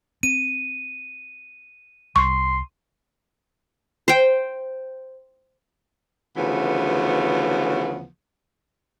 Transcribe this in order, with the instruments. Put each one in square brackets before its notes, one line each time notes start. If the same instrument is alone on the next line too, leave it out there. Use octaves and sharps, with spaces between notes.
[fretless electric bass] C4 [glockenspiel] D#7
[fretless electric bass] C2 [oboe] C6 [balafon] C#6
[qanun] C5 G5
[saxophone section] D2 C#3 E3 F3 B3